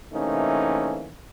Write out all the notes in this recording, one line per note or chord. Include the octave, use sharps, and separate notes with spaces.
C3 E3 A3 A#3 C#4 D#4